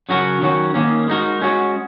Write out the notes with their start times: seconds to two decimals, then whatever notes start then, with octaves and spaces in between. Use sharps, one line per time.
0.09 C#3 F#3 C#4 F#4 A#4
0.41 D#3 F#3 C#4 F#4
0.74 D#3 A#3 C#4
1.08 G#3 D#4 F#4 A#4
1.42 G#3 C#4 F#4